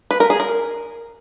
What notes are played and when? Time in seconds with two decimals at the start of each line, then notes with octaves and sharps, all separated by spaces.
0.11 B4
0.20 A#4
0.30 G#4
0.40 A#4